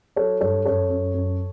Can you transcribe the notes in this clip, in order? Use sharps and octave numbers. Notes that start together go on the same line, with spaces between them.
F#3 A4 C#5
G2 A4 C#5
F#2 A4 C#5
F#2
F#2